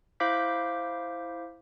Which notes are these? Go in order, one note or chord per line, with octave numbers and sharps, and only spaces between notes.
E4 C5 F5 D6 G6 B6